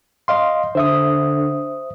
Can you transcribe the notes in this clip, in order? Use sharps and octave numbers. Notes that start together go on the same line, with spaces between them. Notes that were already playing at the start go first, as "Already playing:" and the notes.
D#5 F5 C6
D3 C5 E5 D#6